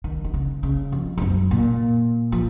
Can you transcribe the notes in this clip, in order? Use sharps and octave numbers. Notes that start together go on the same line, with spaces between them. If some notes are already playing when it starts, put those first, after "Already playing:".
D#3
D#3
C#3
C#3
F2
G#2
F#2
A#2
F3